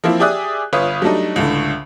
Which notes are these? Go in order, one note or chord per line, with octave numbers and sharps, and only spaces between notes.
F3 A#3 C4 E4
G4 G#4 D5 E5 D#6 F#6
G1 F4 B4 C#5 D#6
F#3 G3 A3 D4 D#4
C#2 A2 D3